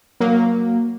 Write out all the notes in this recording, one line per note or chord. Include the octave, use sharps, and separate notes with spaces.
F#3 A#3